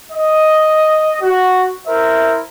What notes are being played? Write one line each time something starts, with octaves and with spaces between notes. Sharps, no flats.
D#5
F#4
E4 A#4 C5 E5